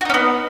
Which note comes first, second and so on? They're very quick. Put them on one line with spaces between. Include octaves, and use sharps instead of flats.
F#4 D#4 C#4 B3